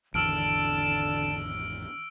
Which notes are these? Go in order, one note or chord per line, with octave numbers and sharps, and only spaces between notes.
G#1 E2 D3 A5 E6 F6 D7